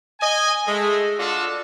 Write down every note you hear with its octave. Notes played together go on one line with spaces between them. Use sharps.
D#5 G#5
G#3 A3
D4 F4 F#4 A4